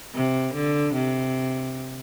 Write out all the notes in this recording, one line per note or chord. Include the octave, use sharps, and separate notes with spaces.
C3
D3
C3